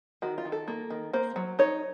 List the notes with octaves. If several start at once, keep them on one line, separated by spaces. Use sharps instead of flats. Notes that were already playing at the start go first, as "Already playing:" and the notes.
D#3 F#4
F4
D#3
A4
A#3
D#3
A#3 C5
F#3
D#4 C#5